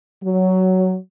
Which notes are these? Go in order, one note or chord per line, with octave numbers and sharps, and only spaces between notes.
F#3